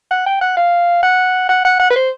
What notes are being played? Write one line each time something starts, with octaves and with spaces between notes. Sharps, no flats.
F#5
G5
F#5
F5
F#5
F#5
F#5
F#5
B4
C5